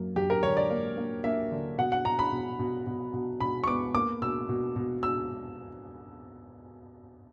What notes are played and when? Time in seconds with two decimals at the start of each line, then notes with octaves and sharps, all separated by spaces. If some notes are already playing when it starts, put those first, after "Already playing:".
Already playing: F#2 A#3
0.16 F#2 G4
0.30 A#4
0.43 D3 C#5
0.57 D5
0.70 A#3
0.97 A#3
1.24 A#3 E5
1.52 D3
1.78 B2 F#5
1.92 F#5
2.05 B2 A#5
2.19 B5
2.32 B2
2.59 B2
2.86 B2
3.13 B2
3.40 B2 B5
3.64 C#6
3.67 B3 D6
3.95 A#3 D6
4.21 B2 E6
4.49 B2
4.76 B2
5.03 B2 E6